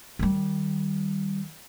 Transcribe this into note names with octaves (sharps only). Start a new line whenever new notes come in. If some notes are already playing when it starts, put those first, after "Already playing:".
D#3 G3